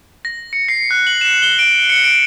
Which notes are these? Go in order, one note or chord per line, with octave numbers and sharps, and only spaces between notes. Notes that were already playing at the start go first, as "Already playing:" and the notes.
A#6
C#7
C7
F#6
F#7
E7
G7
D7
C#7
D7